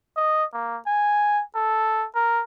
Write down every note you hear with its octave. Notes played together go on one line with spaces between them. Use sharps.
D#5
A#3
G#5
A4
A#4